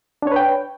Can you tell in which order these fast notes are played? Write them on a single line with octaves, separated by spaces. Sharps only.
D4 C#5 B4 G5